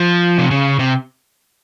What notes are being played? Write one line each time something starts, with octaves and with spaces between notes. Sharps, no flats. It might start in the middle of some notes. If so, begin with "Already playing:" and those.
Already playing: F3
C3
C#3
C3